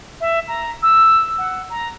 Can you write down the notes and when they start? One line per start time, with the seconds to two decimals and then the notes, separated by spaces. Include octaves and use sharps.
0.21 E5
0.48 A#5
0.83 E6
1.38 F#5
1.70 A#5